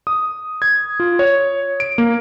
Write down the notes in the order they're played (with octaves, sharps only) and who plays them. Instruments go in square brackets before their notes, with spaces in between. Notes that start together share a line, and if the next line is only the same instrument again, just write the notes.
[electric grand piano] D#6
G#6
F4
C#5
D7
A#3